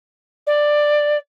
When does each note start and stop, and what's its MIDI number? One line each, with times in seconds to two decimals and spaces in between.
0.47 1.18 74